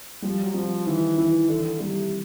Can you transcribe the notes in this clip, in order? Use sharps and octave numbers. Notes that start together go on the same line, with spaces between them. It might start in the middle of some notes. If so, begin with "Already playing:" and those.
F3 G3
F#3
F3 C4
D#3 E3
E3 E4
D3 E3
C3 G3